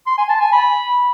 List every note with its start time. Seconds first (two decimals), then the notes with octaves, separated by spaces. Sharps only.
0.06 C6
0.18 G#5
0.29 A5
0.41 G#5
0.52 B5